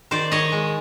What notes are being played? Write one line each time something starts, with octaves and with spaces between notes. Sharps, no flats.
D#3 C5 D5
D#3 C#5 D#5
G#3